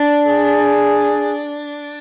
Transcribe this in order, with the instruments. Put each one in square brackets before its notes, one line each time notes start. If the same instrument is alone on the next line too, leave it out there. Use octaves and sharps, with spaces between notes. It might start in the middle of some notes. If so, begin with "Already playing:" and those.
Already playing: [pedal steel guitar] D4
[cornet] G#4